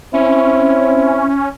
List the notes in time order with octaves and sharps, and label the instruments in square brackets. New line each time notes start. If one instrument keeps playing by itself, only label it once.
[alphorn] C4 [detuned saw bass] C#4 [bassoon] E4